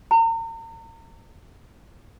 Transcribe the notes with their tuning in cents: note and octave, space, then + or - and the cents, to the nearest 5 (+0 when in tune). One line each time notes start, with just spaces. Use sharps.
A#5 -40